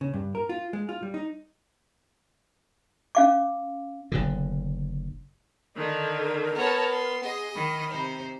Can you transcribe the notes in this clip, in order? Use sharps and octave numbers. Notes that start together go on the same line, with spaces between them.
C#3
G2
A#4
F4
G#3
F4
G3
D#4
C#4 F5 D6
F#1 B2 D3
D3 D#3 D#4 A#4
B3 C#5 A5 A#5
C6
G#4 D#5
D#3 B5
C3 D#4 C5